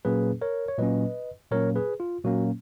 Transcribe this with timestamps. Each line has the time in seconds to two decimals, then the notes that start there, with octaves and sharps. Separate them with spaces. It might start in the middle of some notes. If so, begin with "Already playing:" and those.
0.05 A#2 F#3 A#3 C#4 G#4 B4
0.41 A#4 C#5
0.68 C#5
0.78 A#2 F#3 A#3 C#4 B4 D#5
1.51 A#2 F#3 A#3 C#4 A#4 C#5
1.76 G#4 B4
2.00 F4
2.24 A#2 F#3 A#3 C#4 F#4